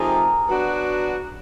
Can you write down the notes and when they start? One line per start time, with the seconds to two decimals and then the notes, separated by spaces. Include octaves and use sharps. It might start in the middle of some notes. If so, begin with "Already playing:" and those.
Already playing: F3 A3 C4 D#4 G4 G#4 A#4
0.48 F#3 B3 D4 F#4